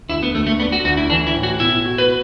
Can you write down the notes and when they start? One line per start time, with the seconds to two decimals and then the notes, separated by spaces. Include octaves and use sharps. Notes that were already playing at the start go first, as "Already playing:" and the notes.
0.09 D2 E4
0.23 B3
0.35 D2 A3
0.47 A3
0.59 B3 D4
0.72 F#4
0.84 D2 F#4
0.97 E4
1.10 E3 D4
1.27 E4
1.34 A2
1.43 F#4
1.60 B2 E4
1.85 F#4
1.98 B4